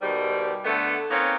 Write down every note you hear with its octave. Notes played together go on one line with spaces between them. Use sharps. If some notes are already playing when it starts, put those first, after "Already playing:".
G#2 B2 D#3 G3
D3 A3 B3
A#3 C4 C#4 D#4 B4 C#5